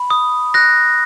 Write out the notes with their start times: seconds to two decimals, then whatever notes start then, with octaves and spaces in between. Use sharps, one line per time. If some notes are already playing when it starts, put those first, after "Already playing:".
Already playing: B5
0.10 D#6
0.54 F#6 A#6